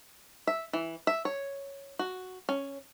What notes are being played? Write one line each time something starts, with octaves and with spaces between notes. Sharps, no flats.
E5
E3
E5
C#5
F#4
C#4